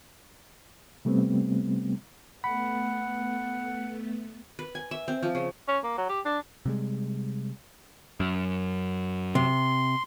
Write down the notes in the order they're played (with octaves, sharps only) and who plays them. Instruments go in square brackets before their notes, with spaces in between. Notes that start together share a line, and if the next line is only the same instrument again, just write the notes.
[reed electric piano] C3 G3 A3 B3 C4
[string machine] A3 B3 [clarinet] F#5 [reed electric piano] B5
[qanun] B4
G#5
E5
C4
F3
C#3
[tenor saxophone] C#4
A#3
F#3
G4
D4
[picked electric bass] C3 G3 G#3
F#2
[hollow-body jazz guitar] C3 [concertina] C6